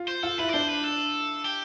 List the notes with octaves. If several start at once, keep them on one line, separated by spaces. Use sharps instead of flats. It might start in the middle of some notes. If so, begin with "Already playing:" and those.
Already playing: F4
C5
F4 A4
E4 B4
D5
D4 C5
B4
A4
G4